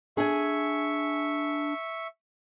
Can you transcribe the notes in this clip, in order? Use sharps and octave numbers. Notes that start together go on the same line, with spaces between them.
D4 G#4 E5 G#5 C#6